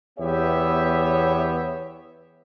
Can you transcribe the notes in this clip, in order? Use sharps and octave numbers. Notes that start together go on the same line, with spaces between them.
E2 B3 G4 C#5 E5